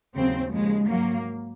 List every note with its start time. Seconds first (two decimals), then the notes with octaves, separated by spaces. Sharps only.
0.16 D#2 C#3 F#3 C4
0.53 D#2 C#3 F3 G#3
0.89 G#2 F#3 A#3